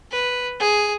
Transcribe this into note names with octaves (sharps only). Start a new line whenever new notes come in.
B4
G#4